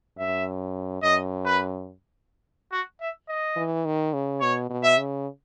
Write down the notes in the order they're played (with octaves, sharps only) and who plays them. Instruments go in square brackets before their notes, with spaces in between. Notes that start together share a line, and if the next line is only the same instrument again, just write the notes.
[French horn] F#2 [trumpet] E5
[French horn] F#2 [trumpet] D#5
[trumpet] B4
F#4
E5
D#5
[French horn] E3
D#3
C#3
[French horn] B2 [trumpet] C#5
[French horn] B2
[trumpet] E5
[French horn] C#3